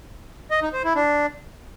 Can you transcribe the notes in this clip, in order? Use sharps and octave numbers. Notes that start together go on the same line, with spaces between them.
D#5
D#4
C5
E4
D4